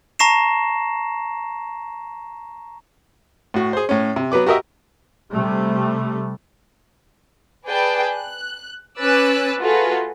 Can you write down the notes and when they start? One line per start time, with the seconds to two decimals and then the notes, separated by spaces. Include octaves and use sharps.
0.19 A5 A#5 C#6 A#6 C7 E7
3.54 A2 F#4
3.73 G#4 C5
3.89 A2 C#4
4.16 C3
4.32 F#3 B3 B4 D6
4.46 F#4 G4 A#4 D#5 E5
5.31 C3 G3 A3
7.67 G#4 B4 D5 G5 A5
8.15 F#6
9.00 C#4 B4 D6 E6 F#6 A6
9.60 A3 F4 F#4 G#4 A4 B4